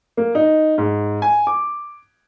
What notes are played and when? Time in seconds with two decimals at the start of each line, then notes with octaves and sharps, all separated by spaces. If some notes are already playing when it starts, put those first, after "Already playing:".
0.17 A#3
0.35 D#4
0.78 G#2
1.22 G#5
1.47 D6